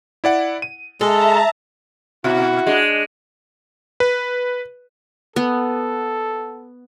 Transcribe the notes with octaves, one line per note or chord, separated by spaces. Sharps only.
E4 D5 F#5
D#7
G#3 A4 E5 A5 A#5
B2 E4 F#4
G#3 D4
B4
B3 A4